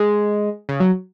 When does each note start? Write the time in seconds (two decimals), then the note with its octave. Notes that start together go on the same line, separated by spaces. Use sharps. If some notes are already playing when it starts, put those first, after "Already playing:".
Already playing: G#3
0.69 C#3
0.80 F#3